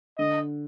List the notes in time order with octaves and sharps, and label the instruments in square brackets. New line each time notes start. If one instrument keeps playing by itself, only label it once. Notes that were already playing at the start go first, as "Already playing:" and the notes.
[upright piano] D3 [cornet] D#5